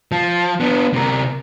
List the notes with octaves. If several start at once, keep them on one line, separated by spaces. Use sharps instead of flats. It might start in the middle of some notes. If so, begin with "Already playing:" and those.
F3
B3 D4
C3 A#4